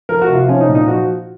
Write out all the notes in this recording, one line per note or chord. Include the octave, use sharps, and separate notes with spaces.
F3 A#4
F#4
C3
F4
F3 C#4
D#4
A#2
D#4
F3 F#4